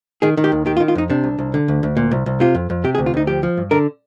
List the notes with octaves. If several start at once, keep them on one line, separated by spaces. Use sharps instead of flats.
D#3 G#4
D#3
G4
D#2
D#3 G4
F4
D#3
F4
F2 D#4
C3 D4
C2
C2
D3
D2
D2
A#2
C2
C2
C3 F4
F2
F2
C3 G4
G#4
D2
F4
D2 D#4
F3 G4
F3
G2
D3 A#4